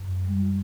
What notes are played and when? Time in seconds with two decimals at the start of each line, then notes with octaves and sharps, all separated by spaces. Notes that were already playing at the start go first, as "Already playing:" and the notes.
Already playing: F#2
0.09 G#3
0.25 G3
0.40 F4